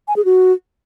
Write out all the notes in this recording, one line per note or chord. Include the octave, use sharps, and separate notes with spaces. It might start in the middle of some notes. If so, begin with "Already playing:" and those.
G#5
G#4
F#4